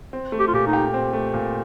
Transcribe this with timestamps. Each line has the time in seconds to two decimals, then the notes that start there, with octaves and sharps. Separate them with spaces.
0.13 C4
0.32 A3
0.40 G4
0.48 F4
0.53 A#2 G4
0.67 D#4
0.73 G4
0.94 C4
1.13 A3
1.34 A#2